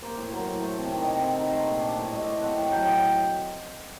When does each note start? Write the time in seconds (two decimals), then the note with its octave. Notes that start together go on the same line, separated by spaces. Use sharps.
0.02 A#3 C5
0.18 A2
0.32 F#3 A#4
0.47 A2
0.63 A3 C5
0.78 C3 D5
0.93 D#3
1.02 C3 D#5
1.22 C4 F#5
1.38 D#4
1.46 A#5
1.52 A3 C6
1.67 A#2
1.82 D4 D5
1.97 A2
2.12 A3 D#5
2.28 A2
2.42 C4 F#5
2.58 A2
2.63 F#5
2.72 F#3 G5
2.87 A2